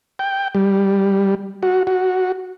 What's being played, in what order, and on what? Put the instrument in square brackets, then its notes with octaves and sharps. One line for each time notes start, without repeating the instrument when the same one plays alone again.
[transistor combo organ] G5
G3
F#4
F#4